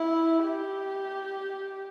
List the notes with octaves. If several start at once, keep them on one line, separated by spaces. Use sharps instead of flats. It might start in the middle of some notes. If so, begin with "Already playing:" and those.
Already playing: E4
G4